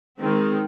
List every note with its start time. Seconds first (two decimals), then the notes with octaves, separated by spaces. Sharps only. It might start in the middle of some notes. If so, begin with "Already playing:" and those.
0.21 D#3 G#3 C4